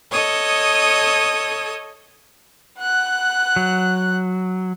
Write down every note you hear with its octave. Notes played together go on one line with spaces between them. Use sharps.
A4 C#5 D#5 D#6
F#5 F#6
F#3